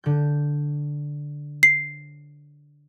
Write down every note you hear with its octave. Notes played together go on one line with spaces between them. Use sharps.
D3 G6
C7